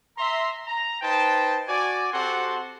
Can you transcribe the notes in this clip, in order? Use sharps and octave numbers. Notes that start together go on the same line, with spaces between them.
E5 A#5 C6
A#5
D#4 B4 C5 G5 A5
F#4 D5 G#5
C4 F#4 G4 A4 F#5 C6